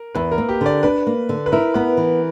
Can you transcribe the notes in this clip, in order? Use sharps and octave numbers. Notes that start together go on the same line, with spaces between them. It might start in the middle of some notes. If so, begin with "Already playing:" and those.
Already playing: A#4
E2 B4
A#4
A#3
G4
D3 D5
D4 B4
A#3
D3
B4
E4 A#4
B3 B4
E3